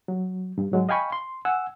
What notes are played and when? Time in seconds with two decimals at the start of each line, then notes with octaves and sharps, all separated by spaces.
0.08 F#3
0.58 G2
0.72 G#2 F#3 G#3
0.89 D#5 F5 G5 G#5 B5 C#6
1.12 C6
1.45 F#5 G#5 E6